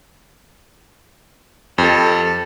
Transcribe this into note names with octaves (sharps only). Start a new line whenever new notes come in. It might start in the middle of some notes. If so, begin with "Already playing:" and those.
F2 G4 A4